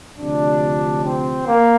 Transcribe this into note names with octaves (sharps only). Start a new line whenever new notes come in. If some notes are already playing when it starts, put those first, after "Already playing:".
D2 C3 F3 D4
C4
A#3